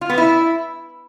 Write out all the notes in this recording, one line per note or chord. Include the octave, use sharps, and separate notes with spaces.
F4
B3
E4